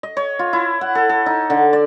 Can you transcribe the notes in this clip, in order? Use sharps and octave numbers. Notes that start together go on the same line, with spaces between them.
D#5
C#5
F4
E4
F#5
A4
A4
D#4
D3
D5